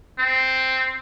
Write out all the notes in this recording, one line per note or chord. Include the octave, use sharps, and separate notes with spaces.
C4